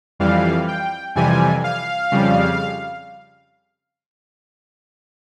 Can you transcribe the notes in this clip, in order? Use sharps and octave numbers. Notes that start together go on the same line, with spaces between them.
F2 E3 G3 F5
G5
F2 C3 E3 G3 G#5
F5
F2 C#3 G3